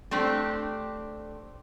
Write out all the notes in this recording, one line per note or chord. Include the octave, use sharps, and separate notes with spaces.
A3 C4 D4 G4